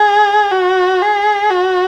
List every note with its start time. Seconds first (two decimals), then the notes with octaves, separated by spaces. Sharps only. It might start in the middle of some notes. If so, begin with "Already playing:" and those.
Already playing: G#4
0.51 F#4
1.02 G#4
1.51 F#4